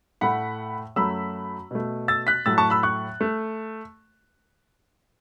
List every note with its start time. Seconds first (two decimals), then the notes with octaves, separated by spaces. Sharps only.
0.21 A2 A3 F#5 B5
0.96 F#2 F#3 A3 B5 E6
1.71 B2 A3
2.08 E6 A6
2.27 F#6 B6
2.46 A2 F#3 A3 E6 A6
2.58 A5 C#6
2.70 B5 E6
2.83 C#6 F#6
3.21 A3